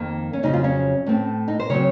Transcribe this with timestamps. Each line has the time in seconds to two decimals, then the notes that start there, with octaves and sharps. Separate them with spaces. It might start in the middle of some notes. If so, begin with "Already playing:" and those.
Already playing: F2 D#3 A#3
0.33 C#4
0.43 F2 C#3 F#3 D#4
0.53 F4
0.64 C#4
1.06 A2 A3 C4
1.48 D#4
1.59 C5
1.70 C#3 F#3 C4 C#5